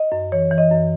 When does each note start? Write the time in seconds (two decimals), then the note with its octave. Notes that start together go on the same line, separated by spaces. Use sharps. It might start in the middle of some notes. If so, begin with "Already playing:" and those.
Already playing: D#5
0.12 F#2
0.32 E3 C#5
0.51 E3
0.58 D#5
0.71 F#2